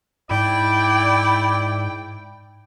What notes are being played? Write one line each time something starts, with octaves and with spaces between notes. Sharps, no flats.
G#2 E4 D5 G5